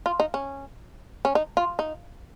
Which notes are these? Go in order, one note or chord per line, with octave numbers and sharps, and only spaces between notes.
F4
D#4
C#4
C#4
D#4
F4
D#4